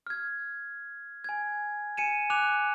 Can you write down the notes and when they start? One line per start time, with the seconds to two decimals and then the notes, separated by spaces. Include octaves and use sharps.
0.07 F6 G#6
1.24 G#5 G#6
1.97 G#5 C#7 D#7 E7
2.30 G#5 D6 F#6 F7